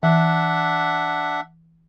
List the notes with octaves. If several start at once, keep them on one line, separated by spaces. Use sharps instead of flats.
E3 D4 E5 F#5